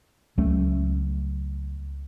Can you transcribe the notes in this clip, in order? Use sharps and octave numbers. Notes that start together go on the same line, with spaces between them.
C#2 F#3 A3 C#4